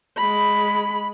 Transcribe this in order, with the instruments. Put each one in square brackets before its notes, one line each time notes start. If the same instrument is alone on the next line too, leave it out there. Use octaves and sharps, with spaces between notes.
[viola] G#3 B5